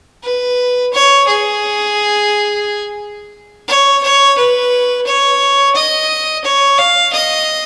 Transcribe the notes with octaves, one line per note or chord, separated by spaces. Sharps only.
B4
C#5
G#4
C#5
C#5
B4
C#5
D#5
C#5
F5
D#5